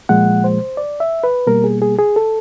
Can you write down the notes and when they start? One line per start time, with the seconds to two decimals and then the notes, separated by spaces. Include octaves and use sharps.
0.09 A#2 F3 G#3 F#5
0.44 C5
0.77 D5
1.00 E5
1.24 B4
1.47 B2 G3 A#3 A#4
1.64 G#4
1.82 G#4
1.98 G#4
2.16 A4